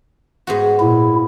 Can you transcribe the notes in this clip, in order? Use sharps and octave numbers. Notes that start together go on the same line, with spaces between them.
G#2 B3 F#4
A#2 E4